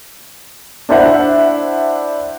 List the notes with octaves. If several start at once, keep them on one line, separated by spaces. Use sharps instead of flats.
D4 E4 C5 E5 F#5